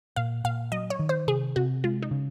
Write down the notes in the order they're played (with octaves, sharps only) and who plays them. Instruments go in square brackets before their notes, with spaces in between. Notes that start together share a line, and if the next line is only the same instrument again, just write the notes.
[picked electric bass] A#2 [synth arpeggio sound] F5
[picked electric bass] A#2 [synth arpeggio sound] F5
[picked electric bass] F#3 [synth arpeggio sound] D#5
[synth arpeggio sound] C#5
[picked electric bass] D#3
[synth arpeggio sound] C5
[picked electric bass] C3 [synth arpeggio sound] G#4
[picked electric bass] C3 [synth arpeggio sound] F#4
[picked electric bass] G#3 [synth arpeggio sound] F4
[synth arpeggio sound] D#4
[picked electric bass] C#3